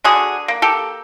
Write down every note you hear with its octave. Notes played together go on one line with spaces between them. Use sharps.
D3 F#4 G#4
A#3
G4 A4